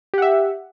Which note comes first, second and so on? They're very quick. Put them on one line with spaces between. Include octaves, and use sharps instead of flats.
G4 F#5 E5